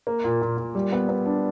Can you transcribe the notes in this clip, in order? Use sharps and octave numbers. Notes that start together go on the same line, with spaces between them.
A#3
A#2
A#2
A#2
G3
B3
B3
D4